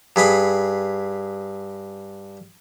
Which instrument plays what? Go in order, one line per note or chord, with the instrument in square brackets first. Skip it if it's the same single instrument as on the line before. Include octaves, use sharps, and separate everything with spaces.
[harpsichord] G2 G#4 B5 D#6